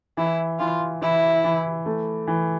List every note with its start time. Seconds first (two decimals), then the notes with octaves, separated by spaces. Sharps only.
0.17 E3 E4
0.59 E3 F4
1.01 E3 E4
1.44 E3
1.86 A3
2.27 E3